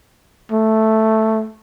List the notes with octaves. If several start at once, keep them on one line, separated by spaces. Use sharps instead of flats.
A3